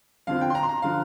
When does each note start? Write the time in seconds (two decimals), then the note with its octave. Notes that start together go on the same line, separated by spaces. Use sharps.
0.27 F2 D3 F3 F5
0.41 G5
0.50 C6
0.55 A#5
0.63 C6
0.69 A#5
0.82 D3 F3 F5